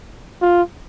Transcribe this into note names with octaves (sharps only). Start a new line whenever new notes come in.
F4